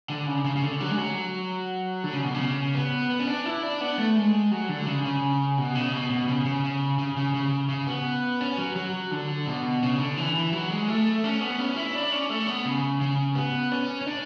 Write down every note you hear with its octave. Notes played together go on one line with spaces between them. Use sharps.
D3
C#3
C#3
C#3
D3
F#3
G#3
F#3
D3
C#3
B2
C#3
B3
B3
C#4
D4
E4
D4
B3
A3
G#3
F#3
D3
C#3
C#3
B2
C#3
B2
B2
C#3
C#3
C#3
C#3
C#3
C#3
C#3
B3
C#4
F#3
F#3
D3
B2
C#3
D3
E3
E3
F#3
G#3
A3
C#4
B3
C#4
E4
D4
C#4
A3
B3
C#3
C#3
B3
C#4
C#4
D4